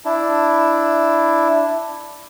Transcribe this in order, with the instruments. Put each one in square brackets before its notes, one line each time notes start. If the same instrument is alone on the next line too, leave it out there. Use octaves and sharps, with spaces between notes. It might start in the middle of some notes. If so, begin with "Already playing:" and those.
[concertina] D4 E4